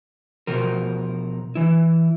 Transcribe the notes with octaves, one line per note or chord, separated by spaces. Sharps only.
B2 F3 A#4
E3 E4